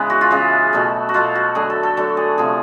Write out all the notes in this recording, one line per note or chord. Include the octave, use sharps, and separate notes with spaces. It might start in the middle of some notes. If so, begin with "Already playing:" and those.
Already playing: C#3 E3 G#3 B3
F#4
F4
C#3 E3 G#3
B2 F#3 A3
F#4
B2 F#3 A3 F4
F#4
D3 F#3 A3 G#4
A4
A4
D3 F#3 A3 A4
G#4
C3 F3 A3 G#4